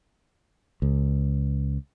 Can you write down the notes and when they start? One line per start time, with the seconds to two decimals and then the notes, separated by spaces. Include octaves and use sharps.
0.82 C#2